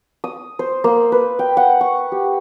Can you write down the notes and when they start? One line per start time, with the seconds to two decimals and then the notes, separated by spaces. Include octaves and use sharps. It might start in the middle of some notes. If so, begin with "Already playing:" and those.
0.24 D#6
0.59 C5
0.84 A#3
1.12 B4
1.39 G5
1.57 F#5
1.81 C#6
2.12 G4